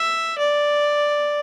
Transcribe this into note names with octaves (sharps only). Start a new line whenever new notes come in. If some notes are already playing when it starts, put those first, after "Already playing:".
Already playing: E5
D5